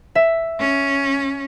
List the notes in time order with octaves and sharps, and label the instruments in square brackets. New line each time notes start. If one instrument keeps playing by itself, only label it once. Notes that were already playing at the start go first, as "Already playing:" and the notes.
[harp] E5
[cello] C#4